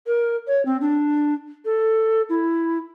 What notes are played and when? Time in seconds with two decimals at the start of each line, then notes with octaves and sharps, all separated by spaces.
0.07 A#4
0.47 C#5
0.65 C4
0.81 D4
1.65 A4
2.29 E4